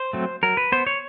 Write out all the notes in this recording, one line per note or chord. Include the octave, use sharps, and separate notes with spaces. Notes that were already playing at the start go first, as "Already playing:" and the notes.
Already playing: C5
F#3 A3 C4
F#3 A#4
B4
B3 C5
C#5